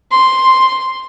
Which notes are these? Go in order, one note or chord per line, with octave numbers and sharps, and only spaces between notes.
C6